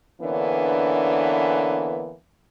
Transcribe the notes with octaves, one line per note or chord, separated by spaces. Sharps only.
D3 E3 A#3 B3 C#4 D4